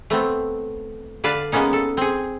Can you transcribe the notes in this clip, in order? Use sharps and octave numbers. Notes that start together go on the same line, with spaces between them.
A3 B3 C4
D3 B4 D5 F5 A5
G#3 A#3 B3 C#4 D#4
A4
C4 G#4